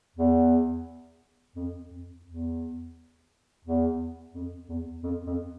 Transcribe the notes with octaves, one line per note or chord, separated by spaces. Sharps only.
E2
F2
F2
E2
E2
F2
E2
F2
F2